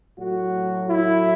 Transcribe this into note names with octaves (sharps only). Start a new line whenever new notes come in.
A2 F#3 A3 F#4
E4